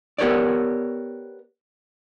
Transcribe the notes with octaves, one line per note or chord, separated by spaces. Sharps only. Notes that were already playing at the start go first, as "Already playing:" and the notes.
B3 G4 A#4 C#5 D5